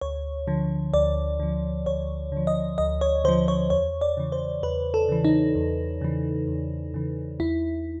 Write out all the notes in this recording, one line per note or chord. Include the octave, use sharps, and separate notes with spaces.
D2 C#5
D3 F3
D2 D5
D3 F3
D2 C#5
D3 F3
D#5
D2 D#5
C#5
D3 F3 C5
C#5
E2 C#5
D5
C#3 E3
C5
E2 B4
A4
C#3 E3
D#4
E2
C#3 E3
E2
C#3 E3
E2 E4